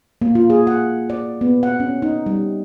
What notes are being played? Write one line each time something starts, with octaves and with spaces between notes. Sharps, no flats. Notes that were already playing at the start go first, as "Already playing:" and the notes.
A#3
F4
G#4
F#5
D5
B3
F#5
C#4
D#4
G3